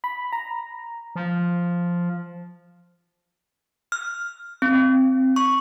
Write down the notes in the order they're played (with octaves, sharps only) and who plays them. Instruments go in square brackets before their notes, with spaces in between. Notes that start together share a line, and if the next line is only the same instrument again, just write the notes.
[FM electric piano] B5
A#5
[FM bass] F3
[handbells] F6
C4
C#6